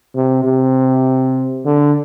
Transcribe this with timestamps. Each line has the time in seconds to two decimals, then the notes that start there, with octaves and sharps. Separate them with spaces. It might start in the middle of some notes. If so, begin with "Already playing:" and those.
0.15 C3
0.45 C3
1.65 D3